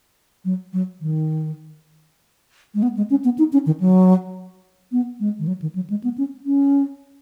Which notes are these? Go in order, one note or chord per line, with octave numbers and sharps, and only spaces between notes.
F#3
F#3
D#3
G#3
B3
G#3
C#4
B3
D#4
C#4
D#3
F#3
B3
G#3
D#3
F#3
D#3
F#3
G#3
B3
C#4
C#4